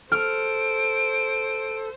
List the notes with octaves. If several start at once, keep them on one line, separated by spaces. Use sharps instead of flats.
A4 C5 F6 D7